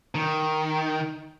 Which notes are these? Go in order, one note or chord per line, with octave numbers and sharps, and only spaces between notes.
D#3